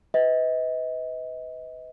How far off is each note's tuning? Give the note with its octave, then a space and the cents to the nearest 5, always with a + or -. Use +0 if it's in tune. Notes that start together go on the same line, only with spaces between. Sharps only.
B4 +25 D#5 +35